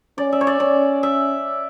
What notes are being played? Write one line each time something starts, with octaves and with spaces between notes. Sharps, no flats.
C#4 D5
E5
C#5
D5
C#4 D5
E5